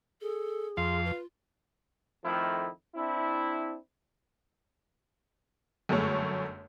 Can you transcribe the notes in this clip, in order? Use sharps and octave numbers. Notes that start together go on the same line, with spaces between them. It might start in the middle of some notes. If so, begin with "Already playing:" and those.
G#4 A4
F2 F5 C6
F4 B4
F2 D#3 F3 A3 E4
C4 D4 E4
G1 F#2 G#3 A3 C#5